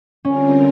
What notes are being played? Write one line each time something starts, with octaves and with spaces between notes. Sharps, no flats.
D3 G3 C4 C#4 F4 A#4